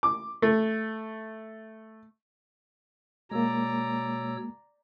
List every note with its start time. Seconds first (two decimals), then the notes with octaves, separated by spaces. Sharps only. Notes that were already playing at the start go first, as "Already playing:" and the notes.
0.03 D6
0.42 A3
3.31 B2 G#3 A#3 C#5 D5 A#5 E6